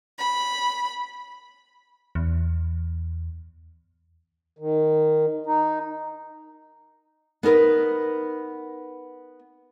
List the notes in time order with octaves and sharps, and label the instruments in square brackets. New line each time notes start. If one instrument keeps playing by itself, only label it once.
[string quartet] B5
[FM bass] E2
[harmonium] D#3
D#4
[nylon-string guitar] B3 D#4 A#4 B4